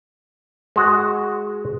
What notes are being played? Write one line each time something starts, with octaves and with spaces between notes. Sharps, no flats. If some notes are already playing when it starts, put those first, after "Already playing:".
G#3 F#4